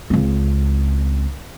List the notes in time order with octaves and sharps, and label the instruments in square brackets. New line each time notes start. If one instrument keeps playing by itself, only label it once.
[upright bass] C#2 C4